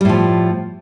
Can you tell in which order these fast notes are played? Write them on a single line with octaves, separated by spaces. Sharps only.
G3 A2 F3